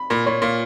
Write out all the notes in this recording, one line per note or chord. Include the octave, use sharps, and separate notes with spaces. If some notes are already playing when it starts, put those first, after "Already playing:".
Already playing: B5
A#2 B5
A#2 C#5
A#2 F4